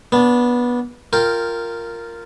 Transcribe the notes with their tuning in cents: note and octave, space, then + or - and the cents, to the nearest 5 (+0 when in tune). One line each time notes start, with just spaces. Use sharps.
B3 -15 D4 -20
F4 +0 A#4 -10 G5 +0